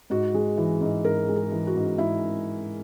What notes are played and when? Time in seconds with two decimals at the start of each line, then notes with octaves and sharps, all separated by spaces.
0.10 G#2 F#4
0.34 G#3
0.57 E3
0.81 G#2
1.04 G#2 A#4
1.28 G#3
1.36 G#4
1.52 E3
1.67 F#4
1.75 G#2
1.98 G#2 E4